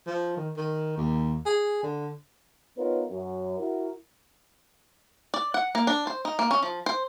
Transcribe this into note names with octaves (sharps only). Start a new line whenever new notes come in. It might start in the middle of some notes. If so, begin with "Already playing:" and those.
F3
D#3
D#3
D#2
G#4
D3
B3 D#4 F4 A#4 B4 C#5
F#2
E4 F#4 A#4
D5
F#5
A#3
D4
C5
D#4
A#3
C#4
F3
C5